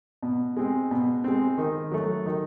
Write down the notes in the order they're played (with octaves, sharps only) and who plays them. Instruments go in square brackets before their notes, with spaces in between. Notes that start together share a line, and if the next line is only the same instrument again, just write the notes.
[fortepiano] B2
G#3 C4
B2
G#3 C4
D#3
F#3 A3
D#3